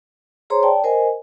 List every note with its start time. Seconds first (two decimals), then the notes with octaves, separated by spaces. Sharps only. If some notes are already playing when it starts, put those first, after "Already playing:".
0.50 G#4 C5 C#5 A#5 C6
0.63 D5 G5 A5
0.84 A#4 C5 D#5 G#5